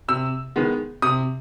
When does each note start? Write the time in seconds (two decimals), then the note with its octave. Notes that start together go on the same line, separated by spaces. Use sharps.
0.08 C3 E6
0.56 D#3 G#3 B3
1.02 C3 D#6